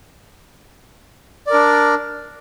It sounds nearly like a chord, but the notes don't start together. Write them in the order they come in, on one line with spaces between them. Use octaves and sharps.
D5 A#4 D4